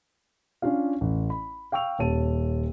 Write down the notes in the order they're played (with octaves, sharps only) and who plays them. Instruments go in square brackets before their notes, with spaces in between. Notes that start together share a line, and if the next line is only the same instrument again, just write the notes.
[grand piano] C#4 D4 F4 F5
A1
B5
F5 G5 C#6 E6 F7
D#1 C#5 A5 D#7